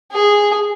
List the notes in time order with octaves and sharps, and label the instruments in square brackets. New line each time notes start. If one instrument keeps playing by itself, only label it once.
[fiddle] G#4